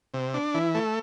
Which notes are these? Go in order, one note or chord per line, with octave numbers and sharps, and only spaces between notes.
C3
D4
E3
A3